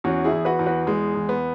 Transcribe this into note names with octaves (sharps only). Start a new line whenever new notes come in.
E2 C#4 F#4
E4 G#4
E2
F#4 B4
E2
F#4 B4
E2 G#3
E2
B3